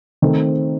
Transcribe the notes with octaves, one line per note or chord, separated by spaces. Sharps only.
D#3 A3 C4